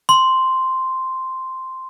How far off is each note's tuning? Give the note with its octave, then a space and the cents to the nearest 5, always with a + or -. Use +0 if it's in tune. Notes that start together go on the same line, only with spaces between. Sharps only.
C6 -5